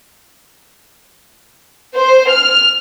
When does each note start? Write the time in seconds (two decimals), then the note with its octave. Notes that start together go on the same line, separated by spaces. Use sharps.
1.96 C5
2.30 F6